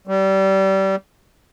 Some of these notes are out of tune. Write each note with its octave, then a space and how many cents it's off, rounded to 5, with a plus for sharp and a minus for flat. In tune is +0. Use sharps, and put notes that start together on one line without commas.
G3 -25